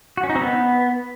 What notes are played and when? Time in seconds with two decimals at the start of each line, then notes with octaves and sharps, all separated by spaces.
0.17 F#4
0.23 C#4
0.29 D#4
0.35 C4
0.41 B3